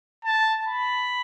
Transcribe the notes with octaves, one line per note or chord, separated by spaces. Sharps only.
A5
B5